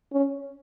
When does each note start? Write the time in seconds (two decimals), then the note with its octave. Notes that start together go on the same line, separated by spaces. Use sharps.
0.13 C#4